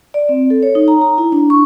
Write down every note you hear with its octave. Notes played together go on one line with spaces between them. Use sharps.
D5
C4
A4
C#5
D#4
A#5
A#5
E4
D4
C#6